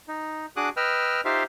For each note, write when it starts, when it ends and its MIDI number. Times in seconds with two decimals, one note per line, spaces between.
0.08 0.46 63
0.57 0.69 62
0.57 0.69 66
0.57 0.69 68
0.57 0.69 86
0.57 0.69 87
0.57 0.69 90
0.77 1.21 71
0.77 1.21 75
0.77 1.21 79
0.77 1.21 88
0.77 1.21 89
1.25 1.43 63
1.25 1.43 65
1.25 1.43 67
1.25 1.43 72
1.25 1.43 76
1.25 1.43 77